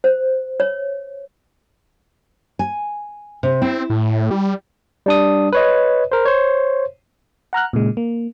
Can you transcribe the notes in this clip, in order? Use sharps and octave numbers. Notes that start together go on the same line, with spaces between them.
C5
C#5
G#5
C3
C4 E4
A2
G3
G3 D4 D#6
B4 C#5 D#5
A#4 C5
C5 C#5
F#5 A#5 F6 F#6
A#2 C#3 G#3
A#3